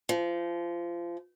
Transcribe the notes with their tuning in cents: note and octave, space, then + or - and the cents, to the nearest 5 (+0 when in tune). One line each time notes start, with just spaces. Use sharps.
F3 -25